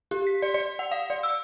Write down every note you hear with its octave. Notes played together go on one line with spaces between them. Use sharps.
G4
B6
D5
D5
F#5
F5
D5
E6